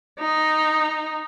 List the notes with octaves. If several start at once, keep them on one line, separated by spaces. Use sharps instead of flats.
D#4